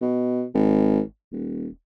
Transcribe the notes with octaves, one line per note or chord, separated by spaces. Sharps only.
B2
G#1
D#1